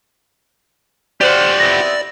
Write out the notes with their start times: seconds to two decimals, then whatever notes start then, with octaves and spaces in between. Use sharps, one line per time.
1.21 F#4 G4 C5 D5 F5 F#5
1.60 B3 C4 E4 A#6